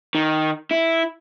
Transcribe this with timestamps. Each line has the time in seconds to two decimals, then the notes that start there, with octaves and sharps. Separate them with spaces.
0.15 D#3
0.71 E4